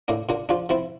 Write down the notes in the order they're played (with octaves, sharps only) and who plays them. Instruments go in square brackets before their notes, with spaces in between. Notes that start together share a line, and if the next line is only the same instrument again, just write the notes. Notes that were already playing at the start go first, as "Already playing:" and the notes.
[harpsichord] A2 A#3 D4
A#2 A#3 D4
F3 D4 F4
F3 C4 E4